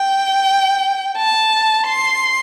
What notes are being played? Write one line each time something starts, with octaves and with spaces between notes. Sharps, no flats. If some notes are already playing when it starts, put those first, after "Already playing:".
Already playing: G5
A5
C6